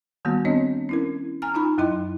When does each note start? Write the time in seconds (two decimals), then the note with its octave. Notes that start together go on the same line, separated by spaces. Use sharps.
0.25 D#3 G3 A#3 B3 F#4
0.45 B3 C4 D4 C#5 D#5
0.89 C#4 E4 A#4
1.42 G#5 A#5 F6
1.54 D#4 F4 A#5 B5
1.78 F#2 F#3 E4 D#5 C6